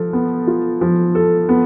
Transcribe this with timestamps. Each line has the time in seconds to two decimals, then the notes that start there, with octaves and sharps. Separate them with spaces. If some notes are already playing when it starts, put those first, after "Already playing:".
Already playing: F3 A4
0.13 B3
0.47 F4
0.81 F3
1.15 A4
1.49 B3